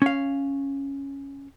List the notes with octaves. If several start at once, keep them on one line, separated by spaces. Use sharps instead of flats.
C#4 F5